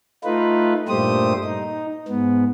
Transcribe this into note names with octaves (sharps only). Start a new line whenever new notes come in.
A3 D#4 F4 B4
G2 A#2 A3 G4 C5 D#6
D#4
G#2 B3